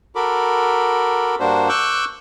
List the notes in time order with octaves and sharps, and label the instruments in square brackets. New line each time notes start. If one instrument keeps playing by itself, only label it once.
[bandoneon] F#4 A4 A#4 B5 D6
G2 A#3 D4 F#4 C5
C#6 D6 E6 F#6 G6